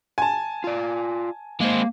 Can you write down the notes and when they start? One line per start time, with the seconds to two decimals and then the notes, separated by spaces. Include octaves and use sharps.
0.18 G#5 A5
0.64 F4 D5
1.60 G#3 A#3 C4